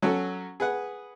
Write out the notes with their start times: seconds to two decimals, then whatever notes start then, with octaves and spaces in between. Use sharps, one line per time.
0.02 F#3 C#4 F#4 A4
0.60 G#4 B4 F#5